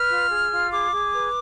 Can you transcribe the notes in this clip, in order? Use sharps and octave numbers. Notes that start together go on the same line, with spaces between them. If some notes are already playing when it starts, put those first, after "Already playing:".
Already playing: B4 F6
F4
G#4
F4
G#4 D6
G#4
B4